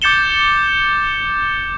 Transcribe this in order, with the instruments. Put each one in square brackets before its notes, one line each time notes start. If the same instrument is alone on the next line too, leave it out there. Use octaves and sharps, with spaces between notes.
[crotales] D6 G6 A6 C#7 E7 G7